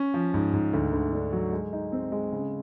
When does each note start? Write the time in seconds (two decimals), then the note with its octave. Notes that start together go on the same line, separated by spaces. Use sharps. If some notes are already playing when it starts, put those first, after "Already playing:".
Already playing: C#4
0.14 F3
0.34 G#2
0.53 G#2
0.73 D2
0.93 D2
1.13 D3
1.33 F#3
1.53 G#3
1.73 D#4
1.92 C4
2.12 G#3
2.32 C#3